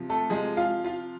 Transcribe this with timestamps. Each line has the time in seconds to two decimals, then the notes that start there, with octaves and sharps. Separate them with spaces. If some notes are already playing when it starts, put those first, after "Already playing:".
Already playing: C3 F3
0.10 A3 A4
0.30 C3 F3 G#3 G#4
0.57 F4 F5
0.84 F4 F5